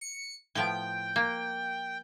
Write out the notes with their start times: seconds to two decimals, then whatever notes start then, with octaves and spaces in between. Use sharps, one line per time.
0.01 C#7
0.55 A2 F3 B3 G5
1.16 A#3